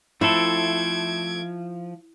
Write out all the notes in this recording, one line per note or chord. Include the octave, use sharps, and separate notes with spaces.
F3 A3 C4 E4 A4 G#6 D7